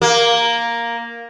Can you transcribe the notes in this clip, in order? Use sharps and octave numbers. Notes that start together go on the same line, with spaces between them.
A#3